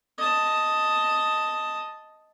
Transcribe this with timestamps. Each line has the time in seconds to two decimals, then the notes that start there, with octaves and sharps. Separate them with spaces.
0.18 D#5 A5